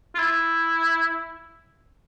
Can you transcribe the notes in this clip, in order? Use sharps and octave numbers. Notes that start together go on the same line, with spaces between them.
F4
E4